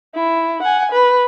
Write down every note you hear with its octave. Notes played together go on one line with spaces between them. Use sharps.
E4
F#5 G#5
B4